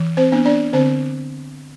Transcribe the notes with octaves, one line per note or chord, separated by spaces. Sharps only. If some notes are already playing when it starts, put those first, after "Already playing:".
Already playing: E3
C4 C5
B3 D4
D4 D5
D3 C4 C5